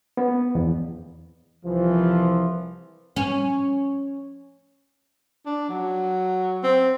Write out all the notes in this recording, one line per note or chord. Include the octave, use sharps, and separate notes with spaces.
B3
E2
C2 E3 F3
C#4
D4
F#3
C4